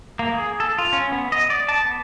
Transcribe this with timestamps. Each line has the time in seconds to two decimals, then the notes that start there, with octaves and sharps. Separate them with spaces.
0.19 A#3
0.34 G#4
0.60 A4
0.78 F4
0.93 C#4
1.12 B3
1.32 D#5
1.50 D5
1.69 A5
1.85 B3